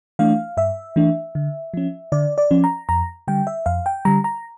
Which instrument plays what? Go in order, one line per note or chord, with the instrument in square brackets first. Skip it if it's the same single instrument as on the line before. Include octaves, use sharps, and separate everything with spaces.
[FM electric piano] E3 A3 D4 F5
G2 E5
E3 A3 D4
D3
F3 C#4
D3 D5
D5
F3 C#4
A#5
F2 A#5
D3 G3 G5
E5
F2 F5
G5
D3 G3 A#5
A#5